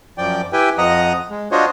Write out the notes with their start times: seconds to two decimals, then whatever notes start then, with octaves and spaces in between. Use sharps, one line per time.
0.18 F#2 F3 D5 G5
0.53 E4 G4 B4 G5 G#5
0.78 F2 F3 D#5 F#5 A#5 D#6
1.30 G#3
1.52 D4 F4 F#4 C5 C#5 D#5